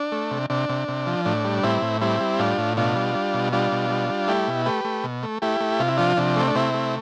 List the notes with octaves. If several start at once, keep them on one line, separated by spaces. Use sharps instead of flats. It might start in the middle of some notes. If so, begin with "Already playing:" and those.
Already playing: D4
A3
C3
C3 D4
C3
C3
F3
A2 D4
G3
A2 C4 E4
A2
G3 C4 E4
G3
A2 D4 F4
A2
B2 D4 F4
G3
G3
B2
G3 D4 F4
B2
G3
G3
A3 E4 G4
B2
A3 G4 B4
A3
B2
A3
A3 E4 G4
A3
C3 F4
E4
F3 D4 F4
C3 D4
A3 C4
D4
C3 C4 E4
A3